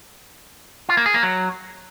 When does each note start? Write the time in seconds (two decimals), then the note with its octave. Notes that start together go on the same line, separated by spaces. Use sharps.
0.89 F4
0.97 A#3
1.06 G#4
1.14 A#3
1.23 F#3